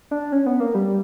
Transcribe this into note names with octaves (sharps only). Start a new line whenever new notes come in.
D4
C#4
B3
A#3
G3